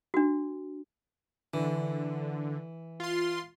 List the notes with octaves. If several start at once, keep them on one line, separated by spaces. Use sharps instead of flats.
D4 F#4
D3 E3
F4 C6